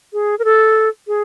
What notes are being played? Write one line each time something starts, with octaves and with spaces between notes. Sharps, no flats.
G#4
A#4
A4
G#4